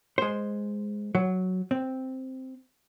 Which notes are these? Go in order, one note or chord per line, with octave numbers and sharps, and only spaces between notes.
G#3 C5
F#3
C4